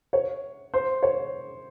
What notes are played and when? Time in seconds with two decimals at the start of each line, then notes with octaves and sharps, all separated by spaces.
0.13 C#5
0.74 C5
1.03 C#5